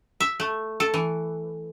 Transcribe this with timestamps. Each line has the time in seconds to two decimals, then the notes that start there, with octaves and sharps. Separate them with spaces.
0.20 E5
0.40 A3
0.80 A4
0.94 E3